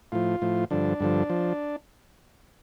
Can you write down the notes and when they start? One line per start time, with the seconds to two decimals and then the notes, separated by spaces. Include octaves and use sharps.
0.12 A2 F3 F4
0.42 A2 F3
0.71 G2 D3 F3 D4
1.00 G2 D3 F3
1.30 F3